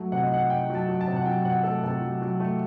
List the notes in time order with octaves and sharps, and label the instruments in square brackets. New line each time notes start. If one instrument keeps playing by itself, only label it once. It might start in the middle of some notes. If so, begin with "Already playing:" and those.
Already playing: [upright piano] F#3 A3
C3 F#5
D#5
D#4 F#5
D#4 G5
F#3
A5
F#3
A5
C3
F#5
F#3 G5
C3 F#5
A3 A4
C3 A4
F#3
F#3
A3